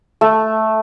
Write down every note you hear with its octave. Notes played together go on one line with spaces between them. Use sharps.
A3